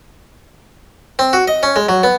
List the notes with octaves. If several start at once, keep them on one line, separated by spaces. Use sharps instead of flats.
C4
F#4
D#5
C#4
G#3
F#3
B3